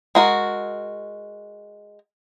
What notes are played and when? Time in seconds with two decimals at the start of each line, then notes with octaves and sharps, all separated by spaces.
0.15 G#3 F#4 A#4